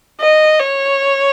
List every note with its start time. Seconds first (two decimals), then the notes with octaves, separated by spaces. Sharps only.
0.21 D#5
0.60 C#5